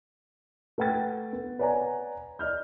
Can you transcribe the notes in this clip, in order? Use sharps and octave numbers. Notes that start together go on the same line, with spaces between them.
A3 B4 F#5 G5 A6
B3
B4 C#5 D5 F#5 G#5 A#5
D5 D#5 F6 G6